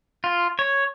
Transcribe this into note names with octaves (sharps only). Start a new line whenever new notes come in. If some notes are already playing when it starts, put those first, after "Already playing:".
F4
C#5